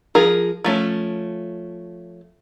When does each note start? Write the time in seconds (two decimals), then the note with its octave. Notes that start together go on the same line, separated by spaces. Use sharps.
0.15 F3 G#4 A#4
0.64 F3 A3 C#4